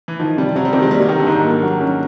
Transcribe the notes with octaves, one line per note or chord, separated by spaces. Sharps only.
E3
D#3 F3
C3 G3
C3 F#3
G3
C3 D#3
G#3
G3 A#3
F#3
D#3 G4
D3
G#2 D#4
A#3
F#3
C#4